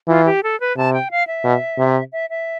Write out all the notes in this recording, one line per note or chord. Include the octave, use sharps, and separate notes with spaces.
E3 F4
G4
A4
B4
C3 A5
G5
F5
E5
B2
C3
E5
E5